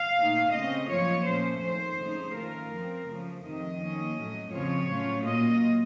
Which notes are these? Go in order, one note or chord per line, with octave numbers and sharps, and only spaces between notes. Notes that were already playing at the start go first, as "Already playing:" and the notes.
Already playing: F5
A#2 A3 D#4
C#3 A3 C4 D#5
F#2 F3 A#3 F4 C#5
A#2 A3 C#4 C5
F2 D#3 A3 C5
C#3 A3 D#4
D#3 A3 C#4 F4 A#4
F#2 F3 C4
F#2 C#3 F3 A3
F2 C3 D#3 D#5
D#3 A#3 C#4
A2 F#3 A3
F2 C#3 F3 C4 F4 C#5
A2 F#3 A3 C#4 F4
A#2 F#3 A#3 F4 D#5